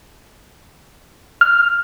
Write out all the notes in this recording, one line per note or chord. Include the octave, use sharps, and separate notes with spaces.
F6